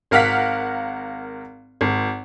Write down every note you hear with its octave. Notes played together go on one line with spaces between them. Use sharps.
G#1 A#4 F5 F#5 F6 B6
G#1